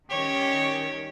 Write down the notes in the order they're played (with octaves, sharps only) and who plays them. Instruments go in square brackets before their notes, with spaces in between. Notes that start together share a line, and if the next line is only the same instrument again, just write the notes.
[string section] D#3 G3 C#4 [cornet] G4 [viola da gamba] C#5